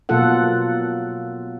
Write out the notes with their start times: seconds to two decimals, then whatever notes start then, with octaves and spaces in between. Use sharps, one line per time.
0.09 B2 F#3 A#3 F4 A4 F#5